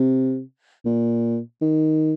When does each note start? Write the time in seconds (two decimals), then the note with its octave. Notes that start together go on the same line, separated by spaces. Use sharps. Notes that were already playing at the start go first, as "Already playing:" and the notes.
Already playing: C3
0.86 A#2
1.61 D#3